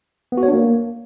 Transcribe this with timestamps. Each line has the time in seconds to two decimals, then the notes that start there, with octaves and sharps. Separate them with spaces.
0.32 B3
0.38 F#4
0.43 C#5
0.48 D4
0.53 A#3